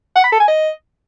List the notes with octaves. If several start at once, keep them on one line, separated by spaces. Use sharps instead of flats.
F#5
B5
A4
G#5
D#5